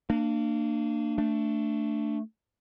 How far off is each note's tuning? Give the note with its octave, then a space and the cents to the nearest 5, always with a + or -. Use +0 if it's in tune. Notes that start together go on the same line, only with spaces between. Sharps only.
A#3 -30 D4 +25
A3 +15 D4 +0